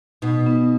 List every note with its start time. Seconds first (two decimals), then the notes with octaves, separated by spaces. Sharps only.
0.22 B2 D#4
0.46 B3